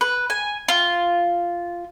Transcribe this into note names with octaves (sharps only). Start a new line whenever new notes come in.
B4
G#5
F4